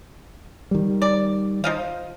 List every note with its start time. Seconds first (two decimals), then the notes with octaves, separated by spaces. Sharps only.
0.71 D#3 G3
1.02 D5
1.64 F3 D#5 F5